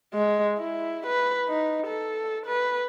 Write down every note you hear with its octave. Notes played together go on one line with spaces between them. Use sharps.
G#3
E4
B4
D#4
A4
B4